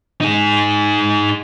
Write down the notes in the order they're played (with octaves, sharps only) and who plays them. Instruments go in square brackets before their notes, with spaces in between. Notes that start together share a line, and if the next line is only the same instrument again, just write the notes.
[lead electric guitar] D#4 G#4